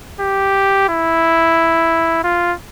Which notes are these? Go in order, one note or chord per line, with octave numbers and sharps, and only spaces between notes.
G4
E4
F4